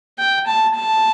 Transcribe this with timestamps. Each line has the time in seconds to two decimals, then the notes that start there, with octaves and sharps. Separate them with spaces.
0.19 G5
0.47 A5
0.75 A5